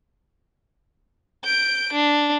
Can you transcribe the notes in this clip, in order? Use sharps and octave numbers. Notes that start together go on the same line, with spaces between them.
G6 D7
D4